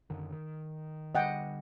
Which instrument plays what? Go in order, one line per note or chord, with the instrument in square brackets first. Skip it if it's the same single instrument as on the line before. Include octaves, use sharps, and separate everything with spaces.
[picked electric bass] F#2 D3 D#3
D#3
[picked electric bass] D3 G3 [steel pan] D#5 F#5 G5